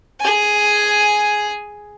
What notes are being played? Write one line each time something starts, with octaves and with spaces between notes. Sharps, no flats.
G#4 G#5